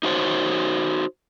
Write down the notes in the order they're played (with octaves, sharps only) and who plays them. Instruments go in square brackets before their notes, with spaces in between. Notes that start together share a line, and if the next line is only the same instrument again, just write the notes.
[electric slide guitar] D#4 F#4 C5 C#5